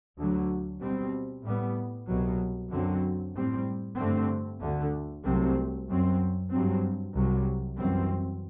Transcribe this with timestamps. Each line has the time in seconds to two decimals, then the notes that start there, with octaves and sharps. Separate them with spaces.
0.17 D2 D3 F#3
0.80 B2 G3 C4
1.44 A2 G3 B3
2.08 C2 B2 F#3
2.71 F#2 D3 F#3 C4
3.35 A2 G3 C4
3.97 G2 D3 A3 C4
4.61 D2 D3 A3
5.25 C2 C3 F#3 A3 C4
5.89 F#2 F#3 C4
6.51 G2 F#3 C4
7.14 C2 C3 F#3
7.78 F#2 E3 G3 C4